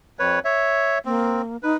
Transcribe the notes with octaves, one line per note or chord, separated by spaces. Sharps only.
F2 B4 C#5
C#5 E5
A#3 C4
D#4 B4